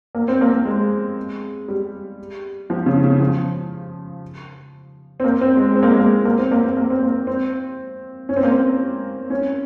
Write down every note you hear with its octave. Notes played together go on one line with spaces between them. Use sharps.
A#3
C4
A#3
A#3
G#3
G3
F3
C#3
C#3
F3
C4
A#3
C4
G#3
C4
A#3
G#3
A#3
A#3
C4
A#3
C4
A#3
C4
A#3
C4
C#4
C4
A#3
C4
C#4